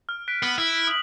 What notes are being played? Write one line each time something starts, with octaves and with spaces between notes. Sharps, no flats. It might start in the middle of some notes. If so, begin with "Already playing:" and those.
F6
F#6 B6 D7
B3
E4
D#6 F#7